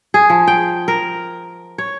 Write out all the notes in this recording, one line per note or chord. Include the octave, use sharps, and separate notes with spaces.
G#4
F3
G5
A#4
C#5